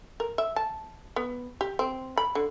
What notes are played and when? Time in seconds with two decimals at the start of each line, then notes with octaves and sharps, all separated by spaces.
0.20 A#4
0.38 E5
0.56 A5
1.16 B3
1.61 G4
1.79 C4
2.17 B5
2.35 D3